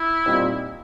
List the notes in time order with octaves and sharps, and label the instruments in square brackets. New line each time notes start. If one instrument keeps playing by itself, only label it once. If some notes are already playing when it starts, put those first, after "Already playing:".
Already playing: [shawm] E4
[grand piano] A#2 G3 C4 D#4